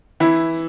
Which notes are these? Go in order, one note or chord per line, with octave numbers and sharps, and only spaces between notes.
E3 E4